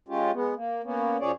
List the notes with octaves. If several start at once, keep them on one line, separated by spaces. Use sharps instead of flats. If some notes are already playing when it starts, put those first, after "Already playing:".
G#3 C#4 F4 G4
G#3 B3
A#3
A#3 B3 C#4
F#2 F3 C#4 G#4 C#5 D5